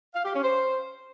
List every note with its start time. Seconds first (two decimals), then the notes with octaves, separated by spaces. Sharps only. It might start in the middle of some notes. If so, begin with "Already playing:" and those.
0.15 F5
0.24 G4
0.33 C#4
0.43 C5